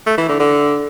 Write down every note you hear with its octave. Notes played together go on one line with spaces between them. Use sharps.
A3
E3
D3
D3